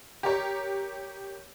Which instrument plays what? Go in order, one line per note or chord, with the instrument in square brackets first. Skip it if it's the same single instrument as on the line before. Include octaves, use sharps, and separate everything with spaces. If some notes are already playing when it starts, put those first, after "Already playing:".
[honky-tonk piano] G4 A#4 C#5